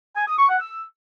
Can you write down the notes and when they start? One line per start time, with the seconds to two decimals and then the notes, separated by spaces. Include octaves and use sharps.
0.16 G#5
0.27 D#6
0.38 C#6
0.50 F#5
0.61 E6